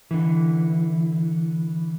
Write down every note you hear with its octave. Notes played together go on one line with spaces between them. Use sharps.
D3 E3